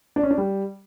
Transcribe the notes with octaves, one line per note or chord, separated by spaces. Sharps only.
D4
C#4
D4
G3